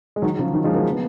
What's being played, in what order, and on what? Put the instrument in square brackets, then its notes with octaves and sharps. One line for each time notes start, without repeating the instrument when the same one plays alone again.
[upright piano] G#3
D#3 F#3
C#3 F3
D#3 F#3
F3 G#3
F#3 A#3
B3